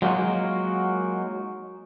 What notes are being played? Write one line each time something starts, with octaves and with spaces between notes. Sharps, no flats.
F#3 G#3 A#3 D#4 F4 F#4